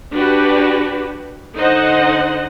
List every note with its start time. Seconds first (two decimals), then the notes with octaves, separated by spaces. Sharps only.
0.14 D4 F#4 G4 B4
1.56 D3 D#4 C5 D#5 F#5